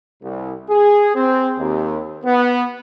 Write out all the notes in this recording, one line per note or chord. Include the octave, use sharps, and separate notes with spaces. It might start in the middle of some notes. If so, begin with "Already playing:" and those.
C2
G#4
C4
D#2
B3